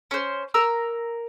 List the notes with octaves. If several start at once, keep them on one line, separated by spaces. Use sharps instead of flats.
C#4 C5
A#4 A#5 E6